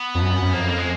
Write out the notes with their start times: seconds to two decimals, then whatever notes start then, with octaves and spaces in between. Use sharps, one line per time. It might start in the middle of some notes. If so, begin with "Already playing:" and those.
Already playing: B3
0.15 F2
0.21 F#2
0.42 F#2
0.53 F2 A#3
0.69 A#3
0.78 G#3